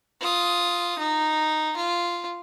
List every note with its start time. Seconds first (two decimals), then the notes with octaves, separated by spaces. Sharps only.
0.21 F4 D#6
0.99 D#4
1.77 F4